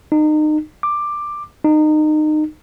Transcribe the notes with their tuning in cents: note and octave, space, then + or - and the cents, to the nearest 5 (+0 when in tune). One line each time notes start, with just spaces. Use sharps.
D#4 -30
D6 +10
D#4 -25